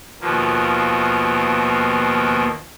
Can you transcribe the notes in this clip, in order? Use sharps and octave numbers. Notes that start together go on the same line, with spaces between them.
D#2 B2 F3 A#3